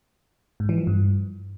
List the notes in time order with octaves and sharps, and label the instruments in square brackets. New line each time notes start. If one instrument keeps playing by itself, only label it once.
[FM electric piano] G#2
E3
F3
G2